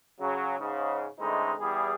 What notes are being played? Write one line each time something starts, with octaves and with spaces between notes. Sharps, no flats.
C#3 F#3
G#2 C#3
D3 E3 G#3 A3 C4 D#4
E2 G3 G#4